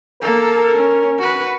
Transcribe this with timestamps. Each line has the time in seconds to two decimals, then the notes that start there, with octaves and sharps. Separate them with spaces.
0.22 A#3 A4 A#4
0.78 C#4
1.19 F#4 B4